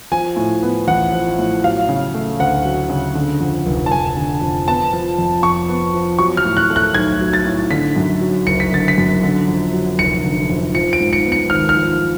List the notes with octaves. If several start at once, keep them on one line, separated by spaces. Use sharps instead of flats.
F3 G#5
A2
B3
A1 F#5
F3
A2
F#3 F5
C#3
A3
D2 F#5
F#3
C#3
D3
F2
F1
A5
F1 G#5
D3
F2
B3 A5
F3
F2
F2 C#6
B3
F3
F#3 C#6
F6
A2
F#6
A3
F#6
B1 G#6
F#3
A6
A2
D3 B6
F#2
F#3
F#1 C#7
B6
D3 A6
B6
F#2
D3
F2
F#3
F1 C#7
D3
F2
F3 C#7
D7
G#2
C#7
B3
C#7
G#1 F6
F6
F3